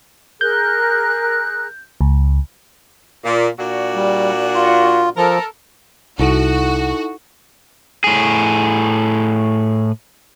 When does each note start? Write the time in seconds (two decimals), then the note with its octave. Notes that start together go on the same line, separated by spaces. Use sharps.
0.41 G#4 A#4 F#6 G6
2.01 C#2
3.25 A#2
3.60 A#2 D4 F#4
3.95 G3
4.54 F4
5.17 F3 A4 A#4
6.19 C2 D#4 E4 F#4 A4
8.04 A2 G#4